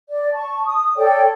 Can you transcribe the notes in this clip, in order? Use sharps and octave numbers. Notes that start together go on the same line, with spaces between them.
D5
A5 C#6
D#6
A4 C#5 D5 G5